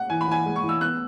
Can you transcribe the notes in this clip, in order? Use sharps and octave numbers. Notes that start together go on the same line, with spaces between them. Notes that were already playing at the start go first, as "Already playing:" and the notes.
Already playing: F#5
E3 G#5
B5
E3 G#5
G#3
C#6
E3
E6
B3 F#6